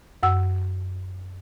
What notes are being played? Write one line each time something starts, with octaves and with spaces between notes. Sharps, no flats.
F#2 F#5 E6